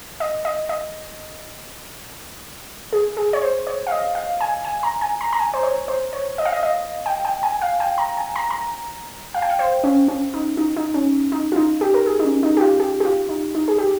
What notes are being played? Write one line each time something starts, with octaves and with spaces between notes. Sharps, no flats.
D#5
D#5
D#5
G#4
G#4
C#5
C5
C#5
F5
D#5
F5
G#5
G#5
A#5
G#5
A#5
A#5
G#5
C5
C#5
C5
C#5
D#5
F5
D#5
D#5
G5
G5
G#5
F5
G5
A#5
G#5
A#5
A#5
F5
G5
F5
C5
C#4
C#4
D#4
D#4
D#4
C#4
D#4
F4
D#4
G4
A#4
G#4
D#4
C#4
D#4
G4
F4
G4
G4
F4
D#4
D#4
G#4
G4